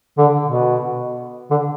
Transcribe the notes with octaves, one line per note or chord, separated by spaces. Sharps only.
D3
B2
D3